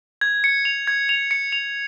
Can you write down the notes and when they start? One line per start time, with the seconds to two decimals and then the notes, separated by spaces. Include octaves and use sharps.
0.21 G#6
0.44 C#7
0.65 F7
0.87 G#6
1.09 F7
1.31 C#7
1.52 F7